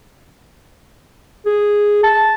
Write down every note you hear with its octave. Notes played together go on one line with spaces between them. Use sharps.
G#4
A5